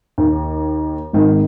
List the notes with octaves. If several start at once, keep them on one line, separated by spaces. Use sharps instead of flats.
D#2
G#1 D#3